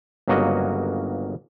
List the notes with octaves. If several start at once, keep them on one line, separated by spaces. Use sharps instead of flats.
G1 C#3 F#3 A#3 F#4 D#5